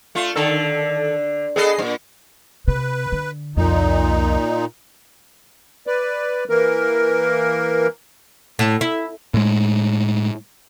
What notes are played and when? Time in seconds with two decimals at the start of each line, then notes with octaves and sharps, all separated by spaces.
0.15 A3 F4
0.36 D3 D#3 A4
1.56 B3 G#4 A4 D#5 C7
1.78 G2 A#2
2.68 C3 B4
3.12 D3
3.57 C2 F2 A#2 D#4
5.87 B4 D5
6.49 E3 A#3 A#4
8.59 A2
8.81 E4
9.34 A2 G#3